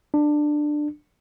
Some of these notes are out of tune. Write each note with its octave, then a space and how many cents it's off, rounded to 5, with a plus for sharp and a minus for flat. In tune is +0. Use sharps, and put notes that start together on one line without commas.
D4 +15